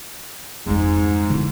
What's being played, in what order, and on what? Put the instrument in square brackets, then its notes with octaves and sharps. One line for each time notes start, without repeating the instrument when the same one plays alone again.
[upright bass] F2 G#3 [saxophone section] G#2
[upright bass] D3 E4